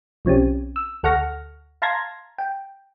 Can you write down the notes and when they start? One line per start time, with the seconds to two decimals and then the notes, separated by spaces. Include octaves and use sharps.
0.25 B1 F3 C4 C#4 G4
0.76 E6
1.03 D2 A4 F#5 C#6 F6 A#6
1.82 F5 A5 A#5 C6 G#6 A#6
2.38 G5